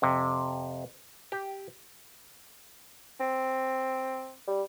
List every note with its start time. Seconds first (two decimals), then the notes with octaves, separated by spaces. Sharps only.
0.02 F2 C3
1.32 G4
3.20 C4
4.48 G3